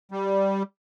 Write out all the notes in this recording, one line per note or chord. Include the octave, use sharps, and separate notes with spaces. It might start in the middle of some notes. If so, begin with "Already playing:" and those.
G3